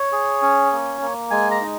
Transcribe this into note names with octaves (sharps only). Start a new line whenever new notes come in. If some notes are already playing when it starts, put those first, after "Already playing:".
Already playing: C#5
G#4
C#4
A#3
A#3
G#3 G#5
A#5
D#4